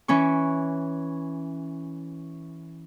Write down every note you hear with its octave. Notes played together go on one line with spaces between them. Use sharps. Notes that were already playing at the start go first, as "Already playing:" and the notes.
E3 C#4 C#6